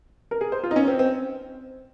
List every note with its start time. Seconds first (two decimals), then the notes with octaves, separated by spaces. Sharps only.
0.31 A#4
0.41 G#4
0.52 C5
0.64 F4
0.71 D#4
0.76 C#4
0.88 C4
0.99 C4